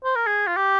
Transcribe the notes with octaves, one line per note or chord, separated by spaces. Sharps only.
C5
A#4
G#4
F4
G4